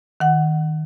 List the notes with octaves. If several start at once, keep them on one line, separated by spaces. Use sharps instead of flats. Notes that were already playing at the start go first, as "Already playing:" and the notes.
D#3 F#5